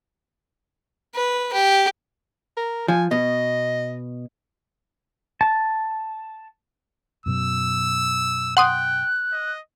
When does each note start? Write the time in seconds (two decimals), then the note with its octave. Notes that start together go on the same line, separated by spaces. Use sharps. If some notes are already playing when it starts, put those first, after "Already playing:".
1.15 B4
1.53 G4
2.57 A#4
2.88 F3 G#5
3.11 B2 D#5
5.41 A5
7.26 F#2 B2 F#3 E6
8.57 F#5 G5 C6 D#6 F#6
9.32 D#5